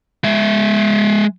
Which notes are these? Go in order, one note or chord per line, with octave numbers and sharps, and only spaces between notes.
G#3 E5